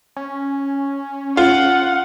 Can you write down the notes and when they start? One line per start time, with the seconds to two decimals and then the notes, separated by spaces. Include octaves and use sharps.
0.17 C#4
1.37 F4 F#5